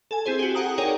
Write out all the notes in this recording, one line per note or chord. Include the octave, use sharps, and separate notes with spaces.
A4 G#5
C4 E4 G#4 C5
F#4 G4
G4 F#5 G#5 A#5 D#6
D#4 G#4 A#4 C#5 D5 G5